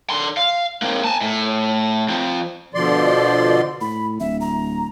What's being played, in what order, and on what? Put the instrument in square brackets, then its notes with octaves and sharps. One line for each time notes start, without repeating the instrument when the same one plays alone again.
[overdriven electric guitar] D3 C6
F5
A#3 C4
G#5 A5
A2
F3 C4
[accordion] B2 D3 F3 D5 C6
[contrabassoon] A2 [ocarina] B5
[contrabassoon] D1 [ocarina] E5
[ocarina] A#5